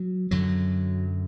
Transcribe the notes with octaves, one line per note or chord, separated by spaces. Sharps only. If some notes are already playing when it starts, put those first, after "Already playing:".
Already playing: F#3
F#2 D3 F#3